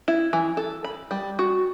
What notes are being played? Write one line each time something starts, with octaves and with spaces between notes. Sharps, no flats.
E4
E3
A4
B5
G3
F#4